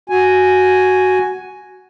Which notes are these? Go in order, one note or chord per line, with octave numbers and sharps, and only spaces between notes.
F#4 G#5